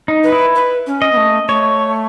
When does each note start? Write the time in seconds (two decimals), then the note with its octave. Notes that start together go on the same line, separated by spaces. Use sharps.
0.08 D#4
0.24 B4
0.32 E4
0.55 B4
0.87 C#4
1.02 D#5
1.12 B3
1.17 A3
1.48 A3 C#5